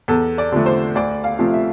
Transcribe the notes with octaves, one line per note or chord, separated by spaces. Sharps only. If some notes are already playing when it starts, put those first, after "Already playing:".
E2 A4
D5
D3 F3 A3
C5
D2 D5
F5
C3 F3 A3
E5